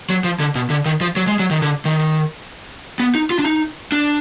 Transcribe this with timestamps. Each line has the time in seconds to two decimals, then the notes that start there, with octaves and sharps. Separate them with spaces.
0.10 F#3
0.24 F3
0.40 D3
0.55 B2
0.70 D3
0.85 D#3
1.01 F3
1.16 F#3
1.27 G#3
1.39 F#3
1.51 D#3
1.62 D3
1.85 D#3
3.00 B3
3.15 D#4
3.30 F4
3.39 D4
3.46 D#4
3.92 D4